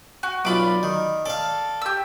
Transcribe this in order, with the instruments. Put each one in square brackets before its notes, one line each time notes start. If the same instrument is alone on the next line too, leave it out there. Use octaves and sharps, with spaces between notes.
[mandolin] F#4
[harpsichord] B1 F4 [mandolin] D5 B5 D6
[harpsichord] D#3
[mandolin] A4 [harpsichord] D5 F5
[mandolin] G4 E6